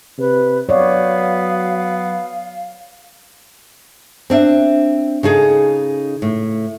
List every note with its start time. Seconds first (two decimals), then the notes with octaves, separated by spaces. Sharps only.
0.18 C3 B4
0.69 F#3 B3 C#5 D5 F5
4.30 C4 D4 E5
5.23 C#3 D#4 G#4 A4
6.22 A2